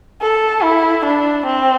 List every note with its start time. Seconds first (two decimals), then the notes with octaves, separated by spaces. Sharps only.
0.22 A4
0.62 E4
1.05 D4
1.46 C4